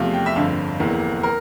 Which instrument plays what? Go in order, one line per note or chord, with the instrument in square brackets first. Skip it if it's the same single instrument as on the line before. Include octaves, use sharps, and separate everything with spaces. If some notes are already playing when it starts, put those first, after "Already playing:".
Already playing: [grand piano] E2 C3 F3 A3 F5
G5
E5
G1 F2 D3 F5
F1 E2 E3 A#3
A#4